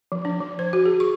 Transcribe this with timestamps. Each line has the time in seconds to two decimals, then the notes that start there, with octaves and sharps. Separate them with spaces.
0.12 F3
0.25 D4
0.40 F3
0.59 C5
0.73 F#4
0.86 G#4
1.00 C#6